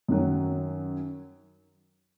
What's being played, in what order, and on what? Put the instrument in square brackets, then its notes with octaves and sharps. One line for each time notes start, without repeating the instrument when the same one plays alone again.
[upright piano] F#2 D#3 F#3